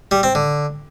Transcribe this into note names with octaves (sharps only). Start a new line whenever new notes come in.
G3
C4
D3